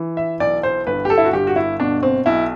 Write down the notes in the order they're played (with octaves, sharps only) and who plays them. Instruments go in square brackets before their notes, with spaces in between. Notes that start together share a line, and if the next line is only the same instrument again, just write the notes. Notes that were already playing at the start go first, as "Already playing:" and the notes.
Already playing: [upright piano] E3
E5
B1 D5
C5
G1 B4
G4
A4
E4
F#4
G1 G4
F#4
E4
B2 D4
C4
B1 E4